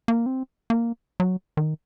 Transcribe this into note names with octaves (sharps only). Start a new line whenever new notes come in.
A#3
C4
A#3
F#3
D#3